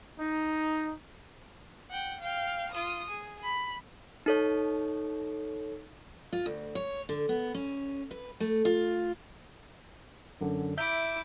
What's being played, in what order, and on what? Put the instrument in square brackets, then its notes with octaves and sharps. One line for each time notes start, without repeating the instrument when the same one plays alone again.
[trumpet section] D#4
[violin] F#5 G5
F5 G5
F4 D#6
G#4
B5
[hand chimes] D#4 A4 C#5
[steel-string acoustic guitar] F4
D2
C#5
D3
B3
C#4
B4
A3
F4
[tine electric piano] F#2 D3
[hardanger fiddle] E4 D6 [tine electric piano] E5 G6